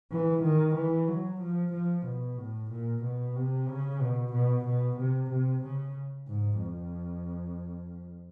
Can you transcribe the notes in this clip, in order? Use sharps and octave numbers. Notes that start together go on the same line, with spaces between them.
E3
D#3
E3
F#3
F3
F3
B2
A2
A#2
B2
C3
C#3
B2
B2
B2
C3
C3
C#3
G#2
F2